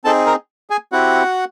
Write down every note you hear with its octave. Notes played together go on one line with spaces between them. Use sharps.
C4 D#4 G#4 A4 A5
A#4 A#5
G#4 G#5
C4 E4 F#4 G4 F#5